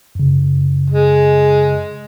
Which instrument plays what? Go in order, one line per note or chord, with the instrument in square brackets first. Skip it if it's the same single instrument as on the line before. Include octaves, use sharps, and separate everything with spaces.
[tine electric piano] F#2 C#3
[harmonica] G#3